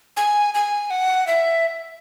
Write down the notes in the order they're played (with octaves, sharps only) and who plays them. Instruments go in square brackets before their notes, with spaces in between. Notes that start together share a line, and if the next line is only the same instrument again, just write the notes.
[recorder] G#5
G#5
F#5
E5